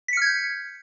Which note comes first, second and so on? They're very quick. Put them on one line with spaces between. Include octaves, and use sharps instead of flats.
B6 C#7 F6 G#6 G6